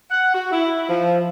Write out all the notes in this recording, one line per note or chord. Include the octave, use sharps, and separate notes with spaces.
F#5
F#4
E4
F3